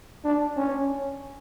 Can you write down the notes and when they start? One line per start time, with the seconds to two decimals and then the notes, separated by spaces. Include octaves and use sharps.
0.25 D4
0.57 C#4